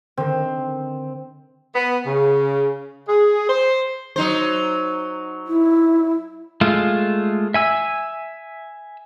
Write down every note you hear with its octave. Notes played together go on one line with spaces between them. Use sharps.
D3 D#3 C4
B3
C#3
G#4
C5
F#3 D#4 C5
E4
G#3 A3 F4
E5 G#5 E6